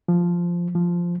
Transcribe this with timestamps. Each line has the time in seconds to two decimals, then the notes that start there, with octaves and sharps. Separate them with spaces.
0.08 F3
0.75 F3